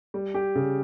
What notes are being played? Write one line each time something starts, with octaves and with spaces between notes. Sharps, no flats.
G3
G4
C#3